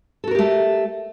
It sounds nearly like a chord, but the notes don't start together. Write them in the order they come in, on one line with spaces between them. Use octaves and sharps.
A4 F#4 A#4 G4 A3